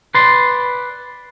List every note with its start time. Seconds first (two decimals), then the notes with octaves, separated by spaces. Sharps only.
0.15 B4 D5 C6